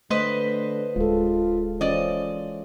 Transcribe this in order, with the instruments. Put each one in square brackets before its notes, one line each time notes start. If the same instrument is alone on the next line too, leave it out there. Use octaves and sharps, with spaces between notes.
[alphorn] D3 [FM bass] A3 [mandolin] B4 C5 D#5
[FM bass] D1 [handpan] G#3 A4 [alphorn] F4
[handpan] E3 C#4 F4 [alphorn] C5 [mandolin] D5 D#5